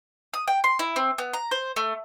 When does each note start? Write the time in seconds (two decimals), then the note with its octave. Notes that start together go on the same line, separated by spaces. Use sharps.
0.34 D#6
0.48 G5
0.64 C6
0.79 E4
0.96 C4
1.18 B3
1.33 A#5
1.51 C5
1.76 A3